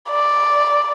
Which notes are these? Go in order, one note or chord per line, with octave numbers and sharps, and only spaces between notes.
D5